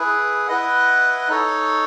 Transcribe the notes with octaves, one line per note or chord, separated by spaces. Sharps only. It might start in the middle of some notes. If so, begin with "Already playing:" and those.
Already playing: E4 G#4 B4
E4 B4 D#5 F#5
D#4 A4 C#5